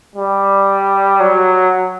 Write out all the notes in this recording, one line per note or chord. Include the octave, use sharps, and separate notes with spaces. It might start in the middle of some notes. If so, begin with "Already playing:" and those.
G3
F#3